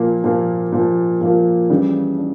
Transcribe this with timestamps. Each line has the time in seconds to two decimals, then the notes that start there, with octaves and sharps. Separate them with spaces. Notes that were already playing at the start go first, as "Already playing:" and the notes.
Already playing: A#2 F3 A#3
0.24 A#2 F3 A#3
0.72 A#2 F3 A#3
1.21 A#2 F3 A#3
1.70 C#3 E3 G3 D4
2.19 D4